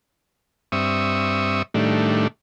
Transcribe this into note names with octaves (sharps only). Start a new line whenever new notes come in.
G2 C4 E5 C#6 D#6
A2 D#3 G3 A3 D4